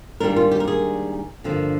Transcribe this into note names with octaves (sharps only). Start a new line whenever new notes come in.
G#2 D#3 G3 A#3 D4 A#4
F4
G4
A#4
G#4
G2 D3 F3 A#3 D4